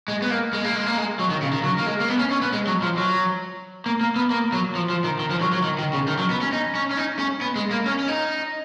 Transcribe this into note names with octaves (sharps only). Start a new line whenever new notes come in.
G#3
B3
A#3
G#3
A#3
G#3
A#3
G#3
F#3
D#3
C#3
D#3
F#3
A#3
G#3
A#3
B3
C#4
C#4
B3
G#3
F#3
F3
F#3
A#3
A#3
B3
A#3
F#3
F3
F3
D#3
D#3
F3
F#3
F#3
D#3
D#3
C#3
D#3
F#3
B3
C#4
D#4
C#4
C#4
D#4
C#4
B3
G#3
A#3
C#4
C#4
D#4